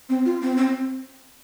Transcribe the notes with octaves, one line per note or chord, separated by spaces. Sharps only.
C4
F4
C4
C4